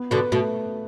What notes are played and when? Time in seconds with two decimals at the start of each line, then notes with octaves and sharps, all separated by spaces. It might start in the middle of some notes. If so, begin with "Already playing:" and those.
Already playing: B3 B4
0.11 B2 D3 B4
0.32 B2 A3